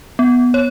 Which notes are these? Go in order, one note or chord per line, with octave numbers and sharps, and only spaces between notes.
B3
C#5